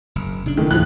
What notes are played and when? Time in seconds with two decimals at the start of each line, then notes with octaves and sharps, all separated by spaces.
0.15 F#1
0.46 C#3 D4
0.57 D#3 E3 A3
0.71 D#2 A2 F3 F#6